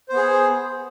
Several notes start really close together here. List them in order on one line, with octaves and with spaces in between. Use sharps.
C5 B3 G#4